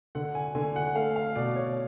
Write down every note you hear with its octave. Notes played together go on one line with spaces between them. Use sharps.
D3 F#5
G#5
D3 G#5
F#5
A3 F5
F5
B2 D5
C#5